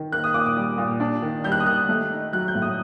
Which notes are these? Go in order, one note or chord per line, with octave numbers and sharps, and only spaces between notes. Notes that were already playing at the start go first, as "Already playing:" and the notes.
Already playing: D#3
A#3 F#6
D#6
A#2 D6
D#6
G3
A#2
D4
D#3
G3 G6
F#6
D#6
D#3 F#6
A3
D#4
F#3 F#6
G6
A2
D#6